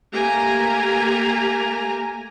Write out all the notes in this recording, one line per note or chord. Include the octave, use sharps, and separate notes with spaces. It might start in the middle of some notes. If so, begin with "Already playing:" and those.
A3 A#3 G4 G#5 A#5